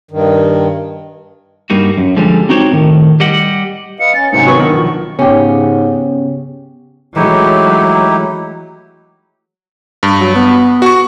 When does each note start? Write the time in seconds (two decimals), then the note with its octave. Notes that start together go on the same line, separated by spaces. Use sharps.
0.11 G2 D#3
1.70 G2 G3 A#3 D#4 F#4
1.98 F#2
2.17 D3 F3 G3 G#3
2.49 C4 D#4 F#4 G4 C5 C#5
2.72 A2 D#3
3.20 G3 G4 D#5 F#5
4.00 B4 D#5 F5 C#7
4.14 C#4 A6
4.33 G#2 C3 F#3 C#4 D#4 C5 C#7
4.46 D#3 F#3 B3 C#6
4.59 D#3 B3 D4
4.73 B1 F3 C#6
5.19 G#2 C#3 B3 C#4 G4
7.16 E3 F#3 G#3 A3 D#4 E4 G4
10.03 G2
10.20 F#3
10.36 B3
10.82 F#4 C#6